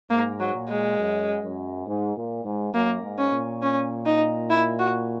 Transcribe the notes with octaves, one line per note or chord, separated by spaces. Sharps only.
G#2 A#3
F#3
A#2
G#3
F#2
F#2
G#2
A#2
G#2
F#2 A#3
G#2
C#4
A#2
C#4
D#4
E4
F#4